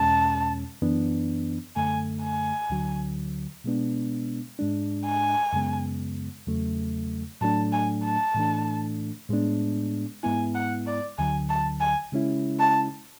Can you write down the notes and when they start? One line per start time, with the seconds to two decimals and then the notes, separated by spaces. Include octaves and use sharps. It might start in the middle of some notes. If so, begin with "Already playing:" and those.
Already playing: E2 B2 G#3 C#4 A5
0.82 F#2 E3 B3 D4
1.76 F#2 D3 A3 G#5
2.23 G#5
2.70 D2 D3 F#3
3.64 B2 G#3 B3 D4
4.59 G#2 G#3 D4
5.06 G#5
5.53 F#2 C#3 G#3 B3
6.47 E2 C#3 F#3 A3
7.41 A2 F#3 A3 D4 A5
7.72 G#5
8.04 A5
8.35 A2 E3 A3 D4
9.29 A2 G#3 B3 D4
10.23 G#2 G#3 B3 E4 G#5
10.55 F#5
10.87 D5
11.18 D2 D3 F#3 G#5
11.49 A5
11.81 G#5
12.12 C#3 G#3 C#4 E4
12.59 A5